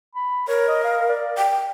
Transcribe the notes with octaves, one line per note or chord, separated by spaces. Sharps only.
B5
A#4 C#5
D#5
F5
D5
G5